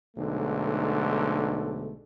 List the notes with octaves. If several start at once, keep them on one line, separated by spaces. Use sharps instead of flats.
B1 G#2 D3 A3